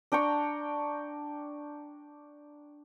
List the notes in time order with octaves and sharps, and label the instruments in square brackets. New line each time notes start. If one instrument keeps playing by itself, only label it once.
[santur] D4 G5 A#5 C#6